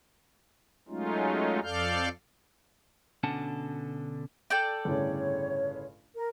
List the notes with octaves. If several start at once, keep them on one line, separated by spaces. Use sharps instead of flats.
F#3 G#3 A3 C#4 D#4 F4
F2 A4 D5 F5 F6 G6
B2 D3 C#4 D4 F#5 A5
A4 D5 G5
G1 A2 C#3 C#5
A#4